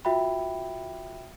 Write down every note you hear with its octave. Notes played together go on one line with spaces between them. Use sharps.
F4 F#4 E5 G5 B5